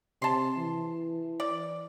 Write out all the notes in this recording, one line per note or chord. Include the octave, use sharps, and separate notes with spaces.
C3 A5 C6
E3
D5